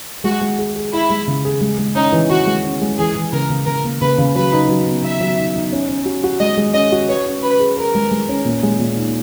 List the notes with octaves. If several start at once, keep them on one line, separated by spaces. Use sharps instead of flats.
G#3 F#4
G#3
G#4
G#4
E4 G#4
G#3
C#3
G#4
G#3
G#3
C#4 D#4
E3
E3 F#4
G#3
C#4
G#3
E3 G#4
E3
C#3 A#4
C#3
C#3 A#4
A#3
C#3 B4
C#3
F#3 B4
D#4
F#3
B3
B3 E5
F#3
D#4
D#4
C#4
C#4
F#4
F#4
G#3 D#5
G#3
C#4 D#5
F#4
B4 C#5
C#4
C#4 B4
G#4
A#4 B4
G#3
G#3
C#4
A#2
G#3
A#2
D#4